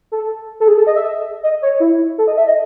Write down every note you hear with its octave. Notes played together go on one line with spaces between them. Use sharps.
A4
A4
G#4
A4
D#5
E5
D#5
C#5
E4
A4
D#5
E5
D#5